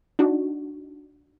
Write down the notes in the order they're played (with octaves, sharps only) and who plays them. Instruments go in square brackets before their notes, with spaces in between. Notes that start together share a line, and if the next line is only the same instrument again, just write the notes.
[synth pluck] D4 D#4 F#4